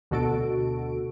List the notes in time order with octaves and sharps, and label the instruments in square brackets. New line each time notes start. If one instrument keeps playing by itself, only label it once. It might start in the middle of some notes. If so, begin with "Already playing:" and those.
[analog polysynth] D2 B2 F#4 A4 D7